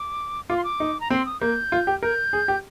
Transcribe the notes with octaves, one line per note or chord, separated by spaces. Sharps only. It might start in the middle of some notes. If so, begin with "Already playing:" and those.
Already playing: D6
F4 D6
C6
D6
D#4
A#5
C4 C6
D#6
A#3 G6
F4
G4
A#4 G6
G#4
G4